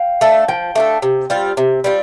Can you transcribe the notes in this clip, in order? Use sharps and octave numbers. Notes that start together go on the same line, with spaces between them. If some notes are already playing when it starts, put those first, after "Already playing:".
Already playing: F5 G5
A3 D4 A4
F3 G5
A3 D4 A4
C3
G3 C4 F4
C3
G3 C4 F4